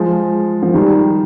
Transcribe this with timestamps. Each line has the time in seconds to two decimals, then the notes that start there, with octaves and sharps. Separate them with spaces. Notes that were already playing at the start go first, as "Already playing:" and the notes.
Already playing: F3 G#3
0.63 F3
0.74 D#3 G3